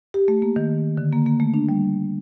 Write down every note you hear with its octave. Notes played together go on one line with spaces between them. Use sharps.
G4
A3
A#3
D#3
D3
A#3
A#3
A3
D4
G3